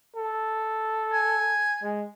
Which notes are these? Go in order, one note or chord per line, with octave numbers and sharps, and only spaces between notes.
A4
G#5
G#3